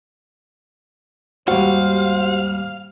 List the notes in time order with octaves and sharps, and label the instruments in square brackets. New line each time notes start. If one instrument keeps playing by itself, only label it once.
[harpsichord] D#2 G#2 G3 [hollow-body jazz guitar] F#4 [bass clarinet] C5 [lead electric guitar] F5